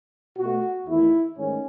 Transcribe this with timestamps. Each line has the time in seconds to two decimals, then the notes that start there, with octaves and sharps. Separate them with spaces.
0.37 B2 A3 F#4
0.87 E2 D#3 A3 E4
1.36 G#2 D#3 A3 C#4